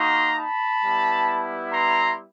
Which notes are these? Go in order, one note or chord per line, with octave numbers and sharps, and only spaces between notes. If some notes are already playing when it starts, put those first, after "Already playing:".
Already playing: A#3 D#4 F#4 A#5 C6
A5 B5
G3 B3 E4
A#5 C6